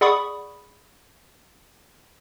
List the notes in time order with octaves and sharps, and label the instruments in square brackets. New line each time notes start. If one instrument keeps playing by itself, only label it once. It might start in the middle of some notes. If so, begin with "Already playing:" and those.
[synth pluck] G#4 D5 F#5 B5 C#6 D#6